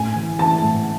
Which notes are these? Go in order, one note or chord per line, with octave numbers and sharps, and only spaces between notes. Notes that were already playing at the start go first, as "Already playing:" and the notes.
Already playing: A2 G#5
E3
E3 A5
A2